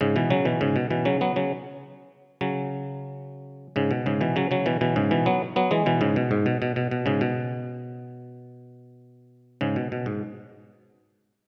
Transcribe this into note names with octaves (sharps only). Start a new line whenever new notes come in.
G#2 C#3
B2 E3
C#3 F#3
B2 E3
G#2 C#3
B2
B2 E3
C#3 F#3
F#3 B3
C#3 F#3
C#3 F#3
G#2 C#3
B2
G#2 C#3
B2 E3
C#3 F#3
C#3 F#3
B2 E3
B2 E3
G#2 C#3
B2 E3
F#3 B3
F#3 B3
E3 G#3
B2 E3
G#2 C#3
B2
G#2
B2
B2
B2
B2
G#2 C#3
B2
G#2 C#3
B2
B2
G#2